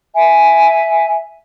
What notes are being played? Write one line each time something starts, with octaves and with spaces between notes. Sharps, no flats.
E5 G#5